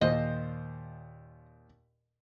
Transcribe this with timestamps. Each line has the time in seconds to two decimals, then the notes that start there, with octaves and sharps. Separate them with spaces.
0.01 D#2 A#2 C5 D#5